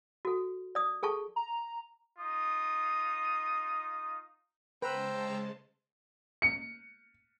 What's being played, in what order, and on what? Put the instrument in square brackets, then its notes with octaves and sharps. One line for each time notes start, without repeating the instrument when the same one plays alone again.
[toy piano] F#4 A4
D5 D#6
G#4 A4 A5 C#6
[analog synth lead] A#5
[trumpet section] D#4 F4 D#6
[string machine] C#3 G#3 A5 [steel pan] B4 [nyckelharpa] C5 [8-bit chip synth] G5 A#5 E6
[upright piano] C#7